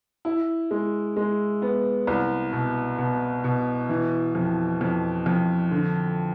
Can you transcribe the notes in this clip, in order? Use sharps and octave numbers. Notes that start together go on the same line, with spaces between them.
E4
G#3
G#3
B3
C2
B2
B2
B2
E3
F2
F2
F2
D3